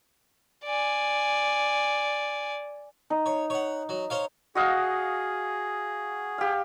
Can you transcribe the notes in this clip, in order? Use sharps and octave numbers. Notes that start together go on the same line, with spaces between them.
D5 G#5
D#4
C#5
C#5 F#5
F#3
C5 C#5 F5
F#4 G#4 D#5 F5
G4 F5